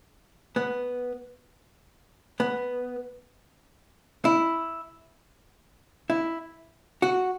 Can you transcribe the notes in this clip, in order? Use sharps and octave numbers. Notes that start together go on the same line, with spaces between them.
B3
B3
E4
E4
F#4